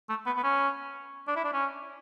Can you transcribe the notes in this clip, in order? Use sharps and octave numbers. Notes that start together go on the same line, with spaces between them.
A3
B3
B3
C#4
D4
E4
D4
C#4